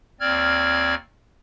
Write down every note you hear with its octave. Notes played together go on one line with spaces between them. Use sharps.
D#2 C4 D5 F6 G#6